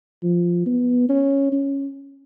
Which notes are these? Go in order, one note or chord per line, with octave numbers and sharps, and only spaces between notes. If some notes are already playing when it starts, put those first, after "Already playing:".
F3
B3
C#4
C#4